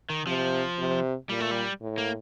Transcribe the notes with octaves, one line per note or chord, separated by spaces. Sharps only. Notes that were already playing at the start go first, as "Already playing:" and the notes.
D#3
C3 F3
C3
A#2 G3
A3
G3
A2
A#3